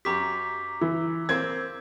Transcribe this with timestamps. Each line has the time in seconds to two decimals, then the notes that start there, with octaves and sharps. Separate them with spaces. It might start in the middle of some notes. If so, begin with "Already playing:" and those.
0.05 F#2 G4 A#5 D6 B6
0.81 E3 E6
1.29 A#3 C4 G#6